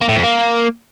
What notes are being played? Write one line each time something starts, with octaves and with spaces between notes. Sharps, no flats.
A#3
A2
F2
A#3